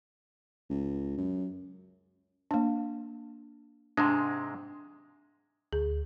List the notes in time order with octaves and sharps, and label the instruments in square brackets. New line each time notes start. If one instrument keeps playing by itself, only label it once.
[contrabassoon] C#2
F#2
[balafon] A#3 D4
[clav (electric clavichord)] G#2 C3 G#3 [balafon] D4
[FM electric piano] D2 [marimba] G#4